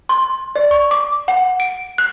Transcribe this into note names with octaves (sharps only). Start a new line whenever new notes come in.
C6
D5
C#6
D6
F#5
D7
F#6